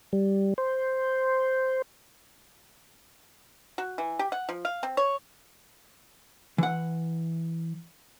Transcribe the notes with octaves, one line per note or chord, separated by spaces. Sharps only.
G3
C5
F#4
E3
G4
F#5
F3
F5
C4
C#5
E3 F#5